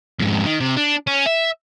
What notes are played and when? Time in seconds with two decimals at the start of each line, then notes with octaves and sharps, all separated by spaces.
0.19 F2 G#2
0.46 D#3
0.60 C3
0.77 D4
1.07 C#4
1.26 E5